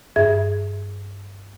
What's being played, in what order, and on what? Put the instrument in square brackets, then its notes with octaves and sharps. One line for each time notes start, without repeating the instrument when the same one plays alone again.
[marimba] G2 G#4 E5 G#6